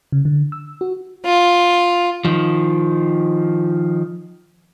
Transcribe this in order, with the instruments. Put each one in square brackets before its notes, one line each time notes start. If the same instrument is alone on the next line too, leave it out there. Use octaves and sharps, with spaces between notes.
[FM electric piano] C#3
D3
E6
F#4
[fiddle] F4
[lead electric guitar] D#3 F3